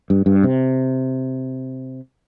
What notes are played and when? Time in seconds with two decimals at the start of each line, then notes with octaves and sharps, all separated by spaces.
0.10 G2
0.26 G2
0.43 C3